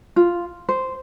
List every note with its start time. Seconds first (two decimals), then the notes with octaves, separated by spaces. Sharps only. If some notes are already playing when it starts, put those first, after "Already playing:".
0.16 F4
0.69 C5